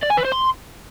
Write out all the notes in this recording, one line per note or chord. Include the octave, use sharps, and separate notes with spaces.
D5
G#5
B4
C5
C6